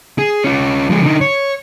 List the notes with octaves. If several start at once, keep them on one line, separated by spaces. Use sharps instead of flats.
G#4
C#4 F4
F3 G#3
D3 D#4
C#5